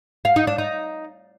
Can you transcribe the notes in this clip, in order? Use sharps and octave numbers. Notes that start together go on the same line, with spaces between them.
F5
D#4
D4
D#4